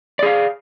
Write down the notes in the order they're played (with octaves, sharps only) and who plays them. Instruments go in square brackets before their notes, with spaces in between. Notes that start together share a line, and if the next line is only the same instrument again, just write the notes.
[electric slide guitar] D5
G#4
F5